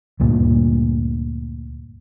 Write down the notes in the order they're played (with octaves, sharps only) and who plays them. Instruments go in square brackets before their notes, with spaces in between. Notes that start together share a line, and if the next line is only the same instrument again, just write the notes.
[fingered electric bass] D2 G2 A#2